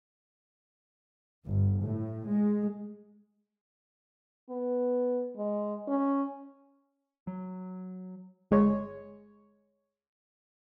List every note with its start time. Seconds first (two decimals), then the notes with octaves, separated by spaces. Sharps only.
1.44 G1
1.82 A2
2.26 G#3
4.50 B3
5.37 G#3
5.88 C#4
7.27 F#3
8.51 G1 G#3 C#5